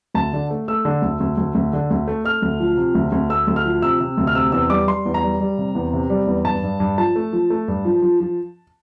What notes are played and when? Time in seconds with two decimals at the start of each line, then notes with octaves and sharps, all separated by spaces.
0.14 D2 A5
0.33 D3
0.50 A3
0.68 A3 E6
0.85 D3
1.02 D2
1.20 D2
1.37 D2
1.55 D2
1.73 D3
1.90 D2
2.08 A3
2.25 A3 F6
2.42 D2
2.60 F3
2.77 C3
2.95 D2
3.12 D2
3.30 A3 E6
3.47 D2
3.56 F6
3.65 F3
3.82 C3 E6
4.00 C3
4.17 D2
4.27 F6
4.35 C3 E6
4.52 E2 E6
4.70 G3 D6
4.87 G3 C6
5.05 E2
5.14 A#5
5.23 G3
5.41 G3
5.58 C3
5.75 E2
5.93 C3
6.10 G3
6.27 E2
6.45 G2 A5
6.63 G2
6.80 G2
6.98 F3 A5
7.16 A3
7.33 F3
7.50 A3
7.68 G2
7.85 F3
8.02 F3
8.20 F3